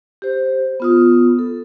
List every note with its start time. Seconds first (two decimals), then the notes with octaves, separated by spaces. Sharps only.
0.22 G4 C5
0.80 B3 F4 D#6
1.39 A4